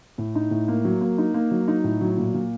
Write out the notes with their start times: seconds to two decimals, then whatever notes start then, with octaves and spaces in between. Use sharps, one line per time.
0.18 A2
0.35 D#4
0.51 A2
0.68 A#3
0.85 F#3
1.01 A#3
1.18 D#4
1.34 A#3
1.51 F#3
1.68 D#4
1.84 A2
2.01 F#3
2.17 A#2
2.34 A#2